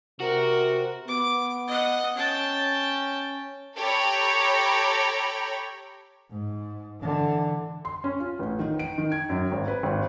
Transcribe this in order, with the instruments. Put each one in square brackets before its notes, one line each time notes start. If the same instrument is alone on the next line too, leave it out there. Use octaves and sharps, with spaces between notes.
[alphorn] C3 [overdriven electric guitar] F#4 [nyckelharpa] A#4
[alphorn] B3 [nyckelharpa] D6
[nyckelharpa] D#5 F#5
[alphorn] C#4 [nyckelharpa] G5 A5
[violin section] G4 A4 C#5 G5 A#5 B5
[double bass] G#2
D3 E3
[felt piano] C6
C#4
F4
A1
D#3
D7
D#3
G#6
F#2
G#1
B4
G#1